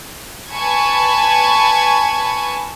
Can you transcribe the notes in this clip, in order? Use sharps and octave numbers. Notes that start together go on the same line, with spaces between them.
B4 G#5 A5 B5 C#6 G#6